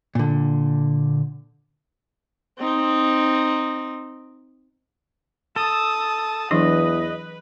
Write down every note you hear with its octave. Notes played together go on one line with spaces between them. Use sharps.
A#2 D3
C4 D#4
A4 A5 D#6
E2 E3 F#3 D4 B4 D#5